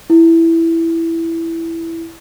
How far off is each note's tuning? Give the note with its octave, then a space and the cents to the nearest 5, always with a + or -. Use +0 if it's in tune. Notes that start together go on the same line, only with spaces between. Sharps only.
E4 +5